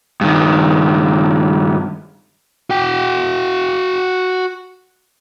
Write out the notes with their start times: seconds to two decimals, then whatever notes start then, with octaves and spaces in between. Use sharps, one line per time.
0.21 G2 D#3
2.70 F#4 G5